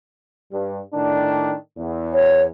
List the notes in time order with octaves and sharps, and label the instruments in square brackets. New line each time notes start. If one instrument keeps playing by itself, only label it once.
[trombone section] G2
A2 D#3 D4
E2
[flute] C#5